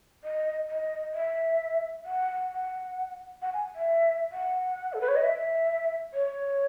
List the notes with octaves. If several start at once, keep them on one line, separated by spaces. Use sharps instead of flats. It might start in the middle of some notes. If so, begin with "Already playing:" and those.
D#5
D#5
E5
F#5
F#5
F#5
G#5
E5
F#5
A4
B4
C#5
D#5
E5
C#5